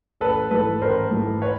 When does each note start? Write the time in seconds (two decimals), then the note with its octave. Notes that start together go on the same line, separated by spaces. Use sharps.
0.21 A1 A4 B4
0.51 G#2 E3 A3 A4 B4
0.82 A1 A#4 C5
1.11 G#2 E3 A3
1.42 B4 C#5